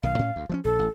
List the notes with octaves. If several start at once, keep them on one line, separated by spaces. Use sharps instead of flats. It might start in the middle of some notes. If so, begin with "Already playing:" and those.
B1 D#3 F5
A2 C#4
D2
F3 G#3 C#4
A#1 A4
A1